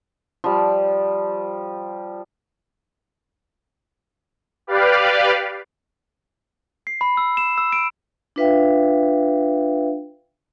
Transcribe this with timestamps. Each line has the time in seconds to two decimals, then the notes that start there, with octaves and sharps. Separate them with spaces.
0.44 F3 G3
4.67 G4 B4 D5 F5
6.87 C7
7.01 B5
7.17 E6
7.37 E7
7.58 E6
7.72 D7
8.36 D4 F4 B4 E5 F5 G5